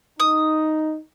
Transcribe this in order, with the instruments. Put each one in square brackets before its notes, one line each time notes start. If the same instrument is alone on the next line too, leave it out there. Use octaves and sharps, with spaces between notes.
[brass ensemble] D#4 [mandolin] D#6